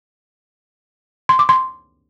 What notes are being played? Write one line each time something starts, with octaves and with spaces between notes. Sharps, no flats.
C6
D6
C6